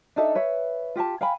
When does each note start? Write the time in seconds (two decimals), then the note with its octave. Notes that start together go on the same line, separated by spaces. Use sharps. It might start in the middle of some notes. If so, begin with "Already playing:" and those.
0.16 D4 D#4 A4 E5
0.35 B4 C#5 E5
0.96 F4 G4 F#5 A5
1.21 F5 G5 G#5 B5